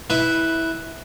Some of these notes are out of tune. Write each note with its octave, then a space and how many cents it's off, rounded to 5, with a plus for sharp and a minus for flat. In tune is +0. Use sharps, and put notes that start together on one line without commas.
E4 -15 B4 +0